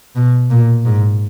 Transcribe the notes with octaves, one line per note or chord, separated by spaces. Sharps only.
B2
A#2
G#2